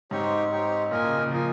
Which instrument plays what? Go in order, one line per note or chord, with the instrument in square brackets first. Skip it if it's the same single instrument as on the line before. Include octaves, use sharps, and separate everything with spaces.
[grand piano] G#2 [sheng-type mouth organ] C4 D#4 G4 C#5
[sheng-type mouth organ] C4 D#4 G4 C#5
[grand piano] A#2 [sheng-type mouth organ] F4 A#4 D#5 G#5
[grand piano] C#3
C#3
[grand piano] F3 [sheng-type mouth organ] F4 A#4 D#5 G#5